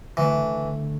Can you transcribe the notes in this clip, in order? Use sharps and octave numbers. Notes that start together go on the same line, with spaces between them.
D3 E3 A3